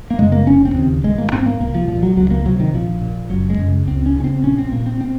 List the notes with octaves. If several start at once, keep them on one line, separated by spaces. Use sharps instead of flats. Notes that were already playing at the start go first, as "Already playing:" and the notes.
A#3
F#2 C#3 G#3
A#3
F1 C#4
C4
D#2 C#3
G#1 G#3
A#3
G#2 C4
A#3
C2 A#3
F3
A#2 F3
F#3
C#2 F#3
A#3
C3 F#3
D#3
A#1 F3
A#2
F#1 F#3
G#3
F#2 C#3
C#2 C4
C#4
C#3
C#4
C4
A#1 C#4
C4
A#2 A#3
C4
C4